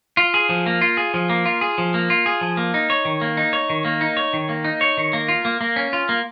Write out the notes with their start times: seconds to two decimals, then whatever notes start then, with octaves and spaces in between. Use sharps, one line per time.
0.17 F4
0.34 G#4
0.49 F3
0.66 A#3
0.81 F4
0.97 G#4
1.14 F3
1.30 A#3
1.45 F4
1.61 G#4
1.78 F3
1.94 A#3
2.10 F4
2.26 G#4
2.41 F3
2.57 A#3
2.74 D#4
2.90 C#5
3.05 D#3
3.21 A#3
3.37 D#4
3.53 C#5
3.70 D#3
3.85 A#3
4.01 D#4
4.17 C#5
4.33 D#3
4.49 A#3
4.64 D#4
4.81 C#5
4.97 D#3
5.13 A#3
5.28 F4
5.45 A#3
5.61 A#3
5.76 C#4
5.93 F4
6.09 A#3